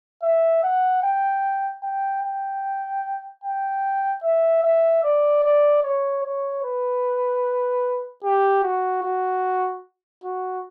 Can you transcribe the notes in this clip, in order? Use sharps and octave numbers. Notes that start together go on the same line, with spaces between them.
E5
F#5
G5
G5
G5
G5
E5
E5
D5
D5
C#5
C#5
B4
G4
F#4
F#4
F#4